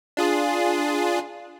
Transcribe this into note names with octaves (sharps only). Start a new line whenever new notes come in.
D4 F4 G#4